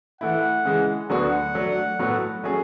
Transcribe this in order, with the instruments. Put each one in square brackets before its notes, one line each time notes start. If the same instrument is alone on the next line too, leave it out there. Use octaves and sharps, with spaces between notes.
[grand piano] E3 A3 E4 [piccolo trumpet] F#5
[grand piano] C#3 E3 G#3
[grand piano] D2 D3 F#3 B3 F#4 [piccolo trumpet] F#5
[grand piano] F#3 A3 D4
A2 F#3 B3 F#4 A4
F#3 A3 C#4 G#4